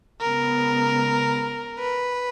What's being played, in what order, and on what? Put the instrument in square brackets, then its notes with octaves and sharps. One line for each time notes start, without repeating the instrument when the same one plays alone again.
[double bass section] C#3 G#3 B3 [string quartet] A#4
[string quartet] B4